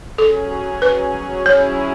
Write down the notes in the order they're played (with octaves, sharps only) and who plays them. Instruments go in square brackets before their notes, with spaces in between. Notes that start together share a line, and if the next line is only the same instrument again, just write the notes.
[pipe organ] F#3 C#4 G#4 [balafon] A4
[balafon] B4
[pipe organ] F#3 C#4 E4 G#4 [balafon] C#5